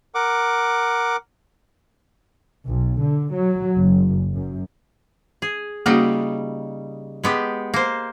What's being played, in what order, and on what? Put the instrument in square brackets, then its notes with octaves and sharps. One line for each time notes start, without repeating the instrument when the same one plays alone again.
[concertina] A#4 F#5 D6
[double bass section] B1
D3
F#3
F#1
F#2
[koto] G#4
[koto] C#3 G3 D#4 [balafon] A#3 F#4
[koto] G#3 B3 G4
A#3 C5